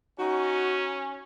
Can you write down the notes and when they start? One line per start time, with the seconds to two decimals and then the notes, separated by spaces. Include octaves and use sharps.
0.19 C#4 D#4 F#4